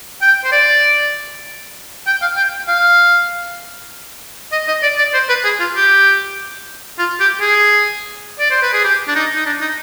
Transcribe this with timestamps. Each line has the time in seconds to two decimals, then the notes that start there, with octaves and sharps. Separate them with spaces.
0.22 G5
0.44 C5
0.52 D5
2.07 G5
2.22 F5
2.37 G5
2.68 F5
4.52 D#5
4.68 D#5
4.83 D5
4.98 D5
5.14 C5
5.29 B4
5.45 G#4
5.60 F4
5.76 G4
6.99 F4
7.20 G4
7.41 G#4
8.40 D5
8.51 C5
8.62 B4
8.73 G#4
8.84 G4
9.08 D4
9.15 D#4
9.35 D#4
9.46 D4
9.61 D#4